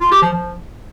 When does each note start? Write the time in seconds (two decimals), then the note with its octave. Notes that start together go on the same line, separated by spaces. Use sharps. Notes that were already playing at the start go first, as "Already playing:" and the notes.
0.01 F4
0.11 G4
0.22 F3
0.32 F3